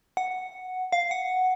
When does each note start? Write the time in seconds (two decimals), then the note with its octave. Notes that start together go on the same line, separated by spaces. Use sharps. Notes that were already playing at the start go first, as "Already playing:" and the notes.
0.17 F#5
0.92 F5
1.11 F#5